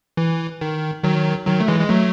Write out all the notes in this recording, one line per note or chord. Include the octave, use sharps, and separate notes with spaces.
E3
D#3
D#3 F#3
D#3 F#3
A3
E3 G#3
G#3
F#3 A3